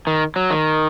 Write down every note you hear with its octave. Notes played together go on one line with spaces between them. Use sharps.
D#3
F#3
D#3